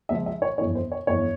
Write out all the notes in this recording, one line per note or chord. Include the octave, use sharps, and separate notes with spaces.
C#2 C#3 F3 E5
E5
C#5
G1 F2 E3 C#5
C5
C#5
G1 F2 E3 C#5